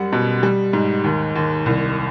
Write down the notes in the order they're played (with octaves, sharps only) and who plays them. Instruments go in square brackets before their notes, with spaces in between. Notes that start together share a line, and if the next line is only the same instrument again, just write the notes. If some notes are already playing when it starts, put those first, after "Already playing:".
Already playing: [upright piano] F#2 G3 F#5
B2
G3
G#2
D#2
D#2
C2